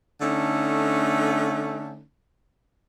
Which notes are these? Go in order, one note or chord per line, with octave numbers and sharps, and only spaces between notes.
D3 A3 C#4 D#4